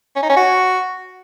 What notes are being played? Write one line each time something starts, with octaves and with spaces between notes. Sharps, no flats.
C#4
D#4
C#4
F#4